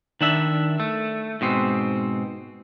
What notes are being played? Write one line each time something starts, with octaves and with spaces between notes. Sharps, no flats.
D#3 D4 E5
A3
G#2 B2 C4